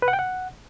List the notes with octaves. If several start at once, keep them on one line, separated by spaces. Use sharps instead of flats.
B4
F#5
G5
F#5